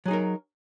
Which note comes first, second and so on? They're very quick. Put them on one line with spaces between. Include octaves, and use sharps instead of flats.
F#3 G#4 D#4 A#4